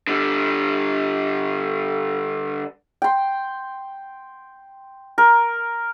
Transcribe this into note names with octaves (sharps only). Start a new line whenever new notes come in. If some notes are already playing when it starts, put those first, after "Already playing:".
D3 G3
G5 C6
A#4